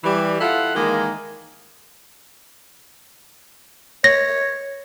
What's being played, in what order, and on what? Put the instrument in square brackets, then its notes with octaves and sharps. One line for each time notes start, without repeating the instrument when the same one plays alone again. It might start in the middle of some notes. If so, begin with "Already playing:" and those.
[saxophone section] E3 G3
E4 F4 A4 F#5
D#3 E3 G#3 A#3
[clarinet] C#5 [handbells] A#6